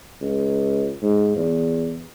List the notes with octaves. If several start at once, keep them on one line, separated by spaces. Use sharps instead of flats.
C#2
G#2
E2